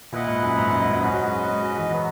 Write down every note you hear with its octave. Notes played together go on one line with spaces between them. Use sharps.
A#2 E4 B4 D#5 F#5
G#2
F#2
G#2
F#2
G#2
F#2
G#2 C#4 F#4 B4 D#5
F#3
G#3
G#3
G#3
F#3
E3
F#3 B3 F#4